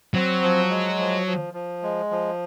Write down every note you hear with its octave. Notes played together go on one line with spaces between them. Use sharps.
F#3 C4
F3
G#3
F3
F3
F3
G#3
F3